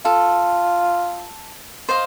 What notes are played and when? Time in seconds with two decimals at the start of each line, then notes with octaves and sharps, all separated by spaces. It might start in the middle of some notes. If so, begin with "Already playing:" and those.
0.05 F4 A4
1.89 C5 D#5 F5